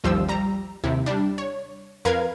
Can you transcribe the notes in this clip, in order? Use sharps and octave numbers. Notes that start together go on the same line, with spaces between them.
A1 D#2 F3 G3 C5 E6
G3 A#5
D#2 C3 E4
G3 D4
C#5
F2 A#4 B4 F5 G#6